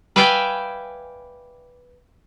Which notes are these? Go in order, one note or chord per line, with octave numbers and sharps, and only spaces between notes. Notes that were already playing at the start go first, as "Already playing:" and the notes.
B4 D5 E5 F5 G5 G#5